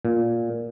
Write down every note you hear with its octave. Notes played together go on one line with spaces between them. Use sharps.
A#2